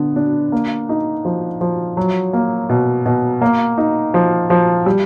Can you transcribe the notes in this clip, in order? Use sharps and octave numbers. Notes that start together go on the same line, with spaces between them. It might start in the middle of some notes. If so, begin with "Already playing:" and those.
Already playing: D3 B3
D4
A#3
D#4
F3
F3
F#3
A#3
B2
B2
A#3
D#4
F3
F3
G3